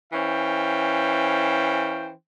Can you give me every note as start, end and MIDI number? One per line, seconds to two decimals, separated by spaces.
0.12 2.10 52
0.12 2.10 61
0.12 2.10 72
0.12 2.10 77
0.12 2.10 79